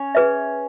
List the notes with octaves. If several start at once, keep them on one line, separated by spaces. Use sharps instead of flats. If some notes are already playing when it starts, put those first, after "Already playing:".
Already playing: C#4 C#5
G#4 B4 E5